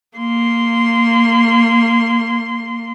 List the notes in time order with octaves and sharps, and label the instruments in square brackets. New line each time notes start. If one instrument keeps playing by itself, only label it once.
[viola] A#3 C6